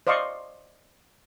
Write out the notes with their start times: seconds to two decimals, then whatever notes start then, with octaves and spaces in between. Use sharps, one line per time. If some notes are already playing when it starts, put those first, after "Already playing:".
0.07 C5 D5 D#5 F5 C6 C#6